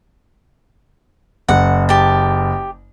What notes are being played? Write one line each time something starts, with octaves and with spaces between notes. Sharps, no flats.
F#1 F#5
G4 A5